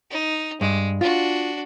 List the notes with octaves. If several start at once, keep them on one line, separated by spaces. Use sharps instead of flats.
D#4
G2 G#3
D4 F4 F#4